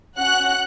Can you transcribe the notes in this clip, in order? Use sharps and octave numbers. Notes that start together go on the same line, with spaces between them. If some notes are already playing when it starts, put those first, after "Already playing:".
C#4 F#4 F#5 F#6